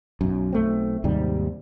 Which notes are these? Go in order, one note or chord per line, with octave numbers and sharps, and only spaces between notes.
B1 F#2
B1 A3 C4
D#2 G#2 C3 G3